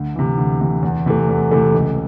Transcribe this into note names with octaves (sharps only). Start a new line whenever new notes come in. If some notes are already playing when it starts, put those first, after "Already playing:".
Already playing: D2
C3 E3
D2
C3 E3
E2
C3 E3 A3
E2
C3 E3 A3
C#2